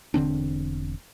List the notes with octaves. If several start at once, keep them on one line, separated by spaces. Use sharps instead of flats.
E1 D3 C4 D4